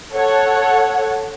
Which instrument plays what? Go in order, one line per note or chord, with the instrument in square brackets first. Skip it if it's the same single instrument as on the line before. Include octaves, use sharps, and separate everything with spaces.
[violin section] A4 C#5 F#5